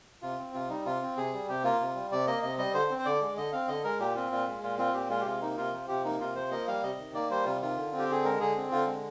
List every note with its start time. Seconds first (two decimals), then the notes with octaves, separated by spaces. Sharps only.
0.22 C3 F4
0.39 C4
0.54 C3 F4
0.69 G3 D#4
0.86 C3 F4
1.02 C4
1.17 C3 G#4
1.33 G3
1.49 C3 G4
1.64 A#3 F4
1.80 C3
1.95 G3
2.12 C3 D5
2.27 A#3 D#5
2.43 C3 D#5
2.58 G3 D#5
2.74 D3 C5
2.91 C4
2.98 C5
3.05 D3 D5
3.21 G#3
3.37 D3 D#5
3.52 C4 F5
3.68 D3 D#5
3.84 G#3 A#4
3.99 A#2 G4
4.15 C4 F4
4.31 A#2 F4
4.48 G#3
4.62 A#2 F4
4.78 C4 F4
4.94 A#2 G4
5.09 G#3 F4
5.21 G4
5.26 C3 F4
5.41 A#3 D#4
5.57 C3 F4
5.73 F3
5.88 C3 G4
6.05 A#3 D#4
6.20 C3 F4
6.35 F3 C5
6.51 A#3 D#5
6.68 G3 F5
6.83 C3 D#5
6.98 D#3
7.15 A#3 D5
7.30 G3 C5
7.45 C3 F4
7.61 D#3 F4
7.77 D3
7.92 C4
7.99 G4
8.09 D3 G#4
8.24 G#3 A#4
8.40 D3 G#4
8.56 C4
8.71 D3 F4
8.87 G#3